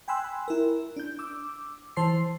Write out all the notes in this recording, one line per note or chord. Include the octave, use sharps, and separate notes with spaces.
G5 G#5 B5 C6 E6 F#6
E4 A#4
D4 G6
D6 E6
E3 C5 A5 C6 C7